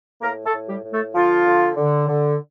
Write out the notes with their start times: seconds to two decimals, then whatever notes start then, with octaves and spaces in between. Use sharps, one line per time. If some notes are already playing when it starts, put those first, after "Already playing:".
0.22 A2 A#3 A#4
0.45 A3 A4
0.53 A2
0.68 G3 G4
0.84 A2
0.92 A3 A4
1.15 D3 F3 F4
1.46 D3
1.77 D3
2.08 D3